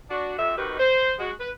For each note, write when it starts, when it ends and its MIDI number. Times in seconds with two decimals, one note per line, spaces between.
0.10 0.33 62
0.10 0.33 66
0.38 0.53 41
0.38 0.53 48
0.38 0.53 76
0.57 0.78 48
0.57 0.78 51
0.57 0.78 63
0.57 0.78 66
0.57 0.78 67
0.57 0.78 71
0.78 1.13 72
1.19 1.31 56
1.19 1.31 66
1.39 1.49 71